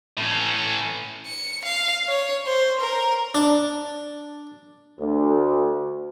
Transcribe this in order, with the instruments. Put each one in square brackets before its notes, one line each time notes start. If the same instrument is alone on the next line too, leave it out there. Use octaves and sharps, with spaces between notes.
[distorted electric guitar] A2 C#4
[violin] C#7
F5
C#5
C5
A#4
[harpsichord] D4
[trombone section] D2